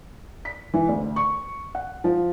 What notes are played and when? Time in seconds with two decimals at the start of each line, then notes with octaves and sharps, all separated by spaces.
0.45 B6
0.74 E3
0.89 D2
1.16 C#6
1.75 F#5
2.04 F3